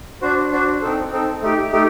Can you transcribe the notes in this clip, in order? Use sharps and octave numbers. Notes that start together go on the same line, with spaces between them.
D4 F#4 C5
D4 F#4 C5
C4 D#4 A4
C4 D#4 A4
A3 D#4 G4
A3 D#4 G4